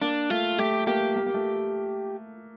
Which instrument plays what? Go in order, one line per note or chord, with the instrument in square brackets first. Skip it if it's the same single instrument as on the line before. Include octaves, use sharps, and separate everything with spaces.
[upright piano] A#3 [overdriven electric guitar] D4
[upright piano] A3 [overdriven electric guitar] F4
[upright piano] A3 [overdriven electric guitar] G4
[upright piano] A#3 [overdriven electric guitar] G4
[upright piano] A#3
A#3
A3